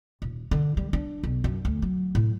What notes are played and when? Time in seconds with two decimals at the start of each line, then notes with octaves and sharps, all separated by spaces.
0.22 D#1
0.51 D3
0.77 G3
0.93 D4
1.23 B1
1.44 F#2
1.65 D2
1.82 F#3
2.15 A2